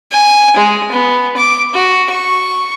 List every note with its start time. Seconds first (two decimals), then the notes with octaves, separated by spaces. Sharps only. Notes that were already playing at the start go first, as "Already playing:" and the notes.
0.12 G#5
0.56 G#3
0.91 B3
1.37 D6
1.74 F#4
2.10 C#6